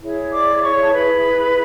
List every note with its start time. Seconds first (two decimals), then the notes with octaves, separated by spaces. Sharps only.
0.02 E4 G#4 C#5
0.32 D5 D6
0.62 C#5 C#6
0.83 A5
0.93 B4 B5